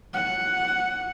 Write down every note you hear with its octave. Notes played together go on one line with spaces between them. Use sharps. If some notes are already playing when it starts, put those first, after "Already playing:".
F#5